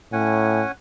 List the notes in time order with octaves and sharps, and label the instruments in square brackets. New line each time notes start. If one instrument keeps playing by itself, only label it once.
[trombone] A2 [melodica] C#4 F#5 G#5